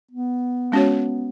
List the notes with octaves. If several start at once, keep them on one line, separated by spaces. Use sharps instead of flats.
B3
G#3 C#4 F#4 C#5